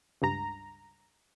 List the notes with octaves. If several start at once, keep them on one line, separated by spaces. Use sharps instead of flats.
C#2 G2 A#5